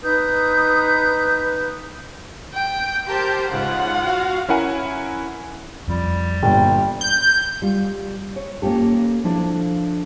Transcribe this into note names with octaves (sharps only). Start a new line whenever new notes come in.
D#4 B4 D#6 G6
G5
G4 A#4 C5 A5 G6
G#2 C#3 F4 F#5
F#4 F5
C#4 E4 A#4 F#5 G#5
F2 F3 G3
G1 G2 A#2 G5
G6
G3 F4
C#5
A#3 C#4 F4 G4 A4
F3 D4 E4 F4 A4